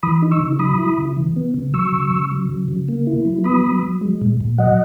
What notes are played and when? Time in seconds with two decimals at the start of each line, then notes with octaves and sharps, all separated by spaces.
0.03 E3 B5 D#6
0.22 D#4
0.31 C#6 E6
0.40 C#3
0.59 F#3 B5 D#6
0.78 E4
0.98 C#3
1.17 E3
1.36 B3
1.54 C#3
1.74 F#3 C#6 E6
1.93 C#3
2.11 C#3
2.31 F#3
2.49 C#3
2.68 C#3
2.88 A#3
3.07 E4
3.25 F#3
3.44 B3 B5 D#6
3.63 F#3
3.83 F#3
4.01 G#3
4.22 A#2
4.41 A#2
4.58 F#3 D#5 F#5